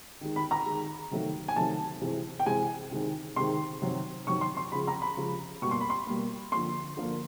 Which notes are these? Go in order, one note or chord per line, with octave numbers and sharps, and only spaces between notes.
D#3 G#3
B5
A#5
D#3 G#3
C3 D#3 F#3 A3
G#5
C3 D#3 F#3 A3 A5
C3 E3 G#3
G5
C3 E3 G#3 G#5
C3 D#3 G#3
C3 D#3 G#3 C6
C3 D#3 F#3
C3 D#3 F#3 C#6
C6
C6
C#3 F3 G#3 B5
A#5
B5
C#3 F3 G#3
B2 G3 A#3 C#6
C6
B5
C6
B2 G3 A#3
D3 F3 A#3 C6
D3 F3 A#3